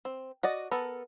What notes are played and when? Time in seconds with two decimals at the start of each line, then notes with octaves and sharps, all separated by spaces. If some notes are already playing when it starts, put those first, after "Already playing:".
0.05 C4
0.43 F#4 D5 D#5
0.71 B3 A4 A#4